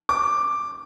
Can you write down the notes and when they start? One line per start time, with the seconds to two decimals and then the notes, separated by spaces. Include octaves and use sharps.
0.09 D6